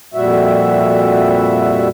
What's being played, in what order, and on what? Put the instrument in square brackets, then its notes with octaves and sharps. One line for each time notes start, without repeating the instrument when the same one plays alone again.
[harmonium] F2 A#2 G3 F#4 E5